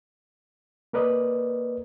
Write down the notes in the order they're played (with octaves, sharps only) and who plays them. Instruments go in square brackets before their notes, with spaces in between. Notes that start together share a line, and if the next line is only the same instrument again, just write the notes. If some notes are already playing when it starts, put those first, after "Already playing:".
[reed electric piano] A#3 A#4 B4 D5 D#5